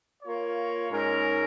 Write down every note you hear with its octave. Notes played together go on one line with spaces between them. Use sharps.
A#3 F4 A#4 C#5
G#2 G#3 C#4 A#4